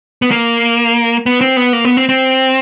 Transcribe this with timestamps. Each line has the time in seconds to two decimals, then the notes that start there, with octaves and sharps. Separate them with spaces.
0.22 B3
0.31 A#3
1.26 B3
1.41 C4
1.57 B3
1.73 A#3
1.85 B3
1.97 C4
2.09 C4